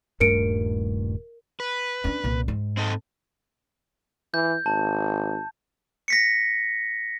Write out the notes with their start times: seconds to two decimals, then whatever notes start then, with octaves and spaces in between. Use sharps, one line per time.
0.20 D#1 G2 A3 A#4 C#7 D7
1.60 B4
2.04 C#4 D4
2.24 C2 A#2
2.48 G#2
2.77 C4 D#4 A4
4.34 E3 G6
4.66 G#1 A5
6.08 A#6 B6 C#7